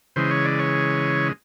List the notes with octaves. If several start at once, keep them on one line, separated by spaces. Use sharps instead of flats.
C#3 E3 G#3 C5
C#5
D5
C#5